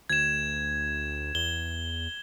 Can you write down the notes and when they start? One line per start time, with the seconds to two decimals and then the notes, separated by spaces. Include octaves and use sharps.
0.09 D2 G#6 E7
1.35 E2 G7